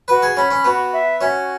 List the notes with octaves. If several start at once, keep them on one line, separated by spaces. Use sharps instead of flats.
F#4 B4
G#4
C#4 B5
C#4
B3 F#4
E5
C#4 F#4